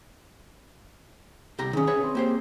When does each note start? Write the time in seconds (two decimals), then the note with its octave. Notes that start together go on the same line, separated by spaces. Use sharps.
1.58 C2 G4 A#5
1.73 D#3 C#4 G#4
1.87 B4 C#5 E5
2.03 C4
2.15 A#3 G4 C5